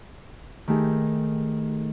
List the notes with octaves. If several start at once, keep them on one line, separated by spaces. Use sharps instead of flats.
D#3 A3 G4 G#4